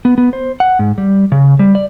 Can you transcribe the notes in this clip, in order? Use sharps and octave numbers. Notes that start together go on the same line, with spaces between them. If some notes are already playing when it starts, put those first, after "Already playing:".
B3
B3
C5
F#5
G#2
G3
C#3
G3
D5